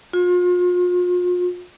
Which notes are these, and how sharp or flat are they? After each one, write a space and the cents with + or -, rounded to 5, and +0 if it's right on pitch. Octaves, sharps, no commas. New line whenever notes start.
F4 +40